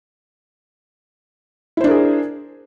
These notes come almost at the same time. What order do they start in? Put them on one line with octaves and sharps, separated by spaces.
E4 C5 D4 A#4 G#4